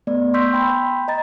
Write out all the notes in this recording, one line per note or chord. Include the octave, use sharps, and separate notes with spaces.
A3 B3 D5
C6 C#6 E6 G6 B6
G5 B5 C6
D#5 A#5 A6